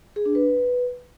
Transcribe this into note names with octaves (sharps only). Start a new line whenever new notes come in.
G#4
D4
B4